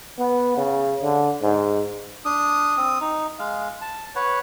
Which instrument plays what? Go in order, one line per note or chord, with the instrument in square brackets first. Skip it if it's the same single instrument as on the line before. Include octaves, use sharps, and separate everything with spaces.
[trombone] B3
C#3
D3
G#2
[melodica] D4 D#6
C4 D#6
D#4
G#3 F5
A5
B4 C#5 F#5